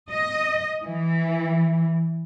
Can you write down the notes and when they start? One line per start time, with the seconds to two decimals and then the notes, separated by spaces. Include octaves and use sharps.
0.10 D#5
0.84 E3